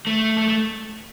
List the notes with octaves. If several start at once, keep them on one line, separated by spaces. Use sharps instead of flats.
A3
A3
A3